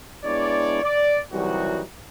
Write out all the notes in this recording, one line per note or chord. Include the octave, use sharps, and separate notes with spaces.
G#3 B3 D4 E4 C#5 D5
D5
C2 E3 F#3 G3 D#4 F#4